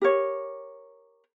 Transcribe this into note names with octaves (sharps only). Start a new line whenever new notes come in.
G4 A#4 C#5